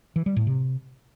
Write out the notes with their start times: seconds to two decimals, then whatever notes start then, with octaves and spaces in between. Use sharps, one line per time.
0.16 E3
0.26 G3
0.36 A2
0.47 C3